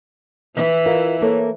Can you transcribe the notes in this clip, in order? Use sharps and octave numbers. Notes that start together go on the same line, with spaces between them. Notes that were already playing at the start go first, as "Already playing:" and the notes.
E3 E4
F4 A#4 D#5
A#3 A4 C#5